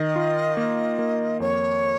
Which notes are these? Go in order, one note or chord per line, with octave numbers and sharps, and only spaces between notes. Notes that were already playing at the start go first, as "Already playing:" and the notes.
Already playing: D#3 D#5
F4
A#3
A#3
F2 C#5